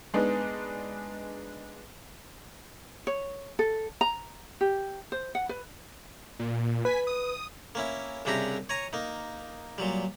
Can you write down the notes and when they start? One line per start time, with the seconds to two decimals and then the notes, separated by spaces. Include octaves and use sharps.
0.14 G#3 B3 D4 D#4
3.07 C#5
3.59 A4
4.01 A#5
4.61 G4
5.12 C5
5.35 F#5
5.49 B4
6.39 A#2
6.85 B4 G#5 B6
7.07 D#6
7.75 A#3 C#4 E4
8.25 C2 C#3 D4 E4 G4 A#5
8.69 C#5 G#5 A#5 C#6
8.93 A#3 D#4
9.78 A#2 F#3 G3